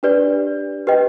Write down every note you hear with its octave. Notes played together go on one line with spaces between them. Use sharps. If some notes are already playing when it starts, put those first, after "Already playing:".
D4 G4 B4 D5
G4 B4 D#5 G5